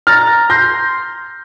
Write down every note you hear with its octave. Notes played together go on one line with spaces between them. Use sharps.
A#5 F6 A6
C6 G6 A#6